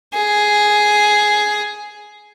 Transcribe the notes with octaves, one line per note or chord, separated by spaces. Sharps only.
G#4